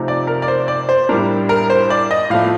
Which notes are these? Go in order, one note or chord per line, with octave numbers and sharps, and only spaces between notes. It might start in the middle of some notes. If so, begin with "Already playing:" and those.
Already playing: C3 F3 A3 C4 D#4
D5
A#4
D5
C5
D5
C5
A2 G3 D4 A#4
A#4
C5
D5
D#5
A2 F3 A3 F5